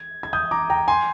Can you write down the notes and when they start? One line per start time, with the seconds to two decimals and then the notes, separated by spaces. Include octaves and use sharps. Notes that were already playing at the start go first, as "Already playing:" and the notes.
Already playing: G#6
0.23 G#6
0.33 D#6 G6
0.51 A#5 D6
0.70 G5 A#5
0.88 G#5 C6